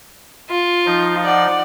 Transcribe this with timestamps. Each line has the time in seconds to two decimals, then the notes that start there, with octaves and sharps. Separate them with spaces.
0.50 F4
0.86 F3 D#4
1.25 D5 F#5